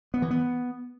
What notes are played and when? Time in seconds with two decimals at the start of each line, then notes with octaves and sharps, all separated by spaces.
0.14 B3
0.22 E3
0.31 B3